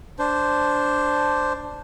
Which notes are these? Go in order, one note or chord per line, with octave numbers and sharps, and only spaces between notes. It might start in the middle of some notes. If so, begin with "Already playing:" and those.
D4 C5